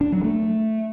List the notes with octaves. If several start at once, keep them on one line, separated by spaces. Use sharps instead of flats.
D4
F#3
A3